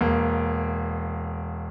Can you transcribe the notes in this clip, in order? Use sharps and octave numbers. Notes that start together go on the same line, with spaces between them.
E1 A#3